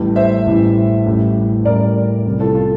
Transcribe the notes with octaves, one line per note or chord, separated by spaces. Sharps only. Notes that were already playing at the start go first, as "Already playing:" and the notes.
Already playing: A1 A2 E3 G3
C5 E5
A1 A2 E3 G3
A1 A2 G3
A1 A2 G3 A#4 D5
C2 C3 E3 G3
F4 A4
F4